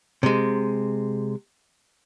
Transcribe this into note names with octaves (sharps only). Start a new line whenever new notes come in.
C3 G#3